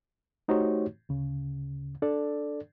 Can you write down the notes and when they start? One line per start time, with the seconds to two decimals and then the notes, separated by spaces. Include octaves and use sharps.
0.48 A3 D#4 F#4 G4 C5 C#5
1.09 D2 C#3
2.02 D4 A4 D5